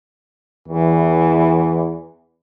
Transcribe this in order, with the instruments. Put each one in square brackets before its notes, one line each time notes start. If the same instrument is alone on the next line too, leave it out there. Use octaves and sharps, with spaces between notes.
[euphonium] E2 [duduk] E3